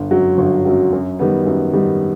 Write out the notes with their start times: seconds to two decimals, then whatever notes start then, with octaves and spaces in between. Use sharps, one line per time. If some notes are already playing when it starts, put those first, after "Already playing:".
Already playing: G1
0.11 F#2 F#3
0.38 G1
0.65 F#2 F#3
0.92 F#2
1.19 D#3 G3 B3
1.46 F#2
1.73 D#3 G3 B3